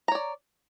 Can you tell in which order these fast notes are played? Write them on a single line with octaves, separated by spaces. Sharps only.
A#5 C#5 D5